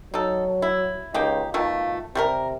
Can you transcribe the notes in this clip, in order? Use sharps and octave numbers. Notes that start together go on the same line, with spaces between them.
F#3 D#4 A4
E4
C#2 A#3 D#4 G4
B2 D#3 A3 F4
C3 G3 F#4 A#4